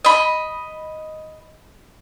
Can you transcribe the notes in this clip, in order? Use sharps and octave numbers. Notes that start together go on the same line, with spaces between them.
D#5 B5